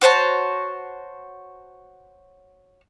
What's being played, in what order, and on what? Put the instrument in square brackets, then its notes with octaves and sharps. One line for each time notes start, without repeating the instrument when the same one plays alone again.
[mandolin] F#4 C5 C#5 A5